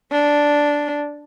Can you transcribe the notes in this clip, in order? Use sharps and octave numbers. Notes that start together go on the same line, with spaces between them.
D4